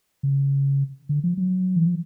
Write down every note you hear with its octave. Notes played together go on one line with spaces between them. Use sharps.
C#3
D3
F3
F#3
E3
F3